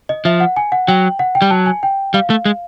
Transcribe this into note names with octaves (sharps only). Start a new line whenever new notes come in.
D#5
F3 E5
F#5
G#5
F#5
F#3 G5
F#5
G5
G3
F#3 A5
G#5
G5
G3 F5
A3
G#3